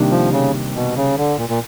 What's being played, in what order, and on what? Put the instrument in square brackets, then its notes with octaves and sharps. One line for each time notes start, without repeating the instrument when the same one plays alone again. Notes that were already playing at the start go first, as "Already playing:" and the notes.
Already playing: [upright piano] C3 D#3 G3 A#3 D4
[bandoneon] F3
C#3
B2
C#3
D3
A#2
A#2